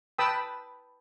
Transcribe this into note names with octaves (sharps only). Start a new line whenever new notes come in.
B4 G5 A5 B5 D#6 E6